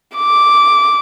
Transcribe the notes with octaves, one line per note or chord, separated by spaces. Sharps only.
D6